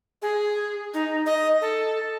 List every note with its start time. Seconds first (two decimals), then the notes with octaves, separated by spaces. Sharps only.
0.22 G#4
0.94 D#4
1.26 D#5
1.61 A4